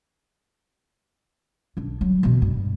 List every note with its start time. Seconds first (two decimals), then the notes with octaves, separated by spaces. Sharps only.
1.77 B1 D4
2.01 F#3 G3
2.23 B2 E3
2.42 G2